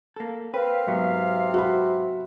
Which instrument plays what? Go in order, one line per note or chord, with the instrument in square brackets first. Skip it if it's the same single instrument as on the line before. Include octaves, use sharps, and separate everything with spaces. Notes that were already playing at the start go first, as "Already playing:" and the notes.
[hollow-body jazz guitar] A#3 A4
[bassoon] C4 [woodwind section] A#4 F5 [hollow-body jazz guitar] B4
[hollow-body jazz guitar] G#2 F#3 B3 [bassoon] C3
[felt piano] F#4 B5